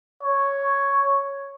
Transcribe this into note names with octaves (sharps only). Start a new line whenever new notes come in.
C#5